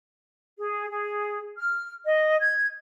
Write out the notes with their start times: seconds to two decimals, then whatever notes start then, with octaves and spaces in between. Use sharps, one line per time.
0.58 G#4
0.90 G#4
1.57 F6
2.05 D#5
2.40 G#6